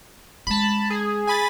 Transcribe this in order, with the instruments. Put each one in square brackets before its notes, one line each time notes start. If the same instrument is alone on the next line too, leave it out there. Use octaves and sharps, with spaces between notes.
[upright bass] G#3 C#4 [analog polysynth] A5 B5
[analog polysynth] G#4
[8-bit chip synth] G#5 B5 A6